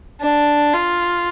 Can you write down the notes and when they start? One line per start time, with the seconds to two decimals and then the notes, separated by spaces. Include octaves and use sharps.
0.22 D4
0.74 F4